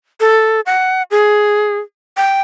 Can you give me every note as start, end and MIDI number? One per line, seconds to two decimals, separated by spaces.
0.20 0.61 69
0.66 1.03 78
1.11 1.79 68
2.17 2.42 79